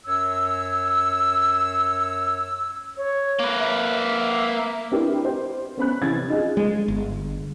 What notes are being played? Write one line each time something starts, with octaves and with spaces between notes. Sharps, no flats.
F#2 C#5 E6
C#5
A#3 B4
E5
C4 D4 E4 G4 A#4 B4
C5
B3 C#4 B5 F#6
C3 E3 C#4 G#6 A6
D#4 F4 G#4
G#3
G1